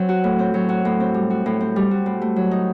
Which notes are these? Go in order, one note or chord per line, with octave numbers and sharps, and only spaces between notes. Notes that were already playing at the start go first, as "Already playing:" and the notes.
Already playing: F#3 C4
F#4
A2
C4
F#3
F#4
A2
C4
G3
F#4
A2
C4
G3
F#4
A2
A3
F#3
D#4